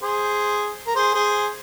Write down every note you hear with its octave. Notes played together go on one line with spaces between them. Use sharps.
G#4 C5
A#4
G#4 C5
G#4 C5